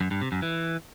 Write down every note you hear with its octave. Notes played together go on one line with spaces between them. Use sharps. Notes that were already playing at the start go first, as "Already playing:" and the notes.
F#2
G2
C3
F#2
E3